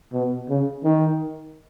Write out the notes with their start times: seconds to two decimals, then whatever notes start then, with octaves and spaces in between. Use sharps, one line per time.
0.13 B2
0.49 C#3
0.84 D#3